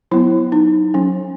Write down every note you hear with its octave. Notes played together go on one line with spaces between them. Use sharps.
F#3 B3 E4
D#4
F#3 C#4